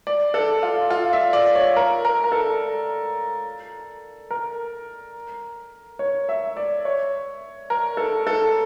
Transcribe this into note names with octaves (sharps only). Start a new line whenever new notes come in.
D5
A4
F4
F4
E5
D5
C#5
A#4
A#4
A#4
A4
A#4
C#5
E5
D5
C#5
A#4
A4
A4